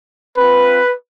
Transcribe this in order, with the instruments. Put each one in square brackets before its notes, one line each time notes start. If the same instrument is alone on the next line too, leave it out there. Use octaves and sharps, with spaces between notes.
[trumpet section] C4 F4 B4